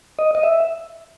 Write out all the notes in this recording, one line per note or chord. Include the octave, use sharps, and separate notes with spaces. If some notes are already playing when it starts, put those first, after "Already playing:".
D#5
D#5
E5